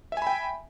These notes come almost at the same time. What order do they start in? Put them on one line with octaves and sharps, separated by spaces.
E5 G#5 B5 G5